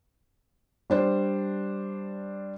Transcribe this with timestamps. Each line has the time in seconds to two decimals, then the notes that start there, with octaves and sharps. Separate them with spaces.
0.90 G3 D4 C5